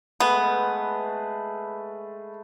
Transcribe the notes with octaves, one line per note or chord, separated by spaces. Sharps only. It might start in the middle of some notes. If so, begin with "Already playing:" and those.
G#3 A3 B3 B4